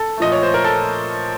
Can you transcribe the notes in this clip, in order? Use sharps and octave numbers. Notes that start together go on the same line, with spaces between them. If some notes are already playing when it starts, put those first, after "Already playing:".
Already playing: A4
A#2 F3 A3 D#5
C#5
C5
A#4
A4